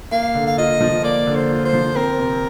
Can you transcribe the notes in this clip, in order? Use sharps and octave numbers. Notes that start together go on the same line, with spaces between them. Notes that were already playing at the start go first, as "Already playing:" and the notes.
A#3 F5
D3
F5
F4 D#5
F3
A#3 D5
D3
C5
F4
C5
F3
C4 A#4
C3